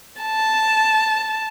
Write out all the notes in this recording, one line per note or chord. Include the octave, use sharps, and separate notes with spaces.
A5